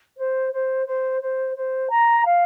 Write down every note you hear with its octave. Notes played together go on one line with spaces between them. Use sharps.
C5
C5
C5
C5
C5
A#5
F5